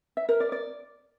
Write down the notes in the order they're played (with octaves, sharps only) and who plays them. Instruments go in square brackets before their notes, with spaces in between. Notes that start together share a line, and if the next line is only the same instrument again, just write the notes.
[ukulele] E5
A#4
D5
D5